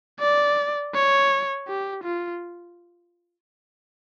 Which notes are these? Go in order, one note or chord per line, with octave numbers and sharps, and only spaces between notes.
D5
C#5
G4
F4